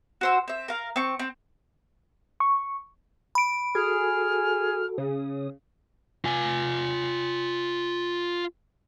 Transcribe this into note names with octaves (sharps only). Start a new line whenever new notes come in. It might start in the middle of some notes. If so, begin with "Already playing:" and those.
F#4 C5 E6
C4 E5
A#4 F5
C4 C#6
C4
C#6
B5 D7
F#4 G#4 A4 F6
C#3 D#6
F4 G#5